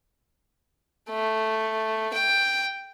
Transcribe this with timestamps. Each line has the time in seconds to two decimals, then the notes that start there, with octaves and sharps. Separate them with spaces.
1.10 A3
2.13 G5